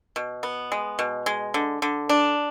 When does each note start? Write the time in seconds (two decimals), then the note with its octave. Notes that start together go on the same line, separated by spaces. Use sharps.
0.16 B2
0.43 B3
0.72 G#3
0.99 B2
1.26 G#3
1.54 D3
1.82 D3
2.09 D4